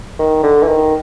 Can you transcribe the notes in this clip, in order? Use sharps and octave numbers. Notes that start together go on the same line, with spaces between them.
D#3
D3
E3
D#3